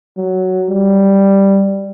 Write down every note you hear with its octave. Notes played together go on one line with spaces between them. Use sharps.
F#3
G3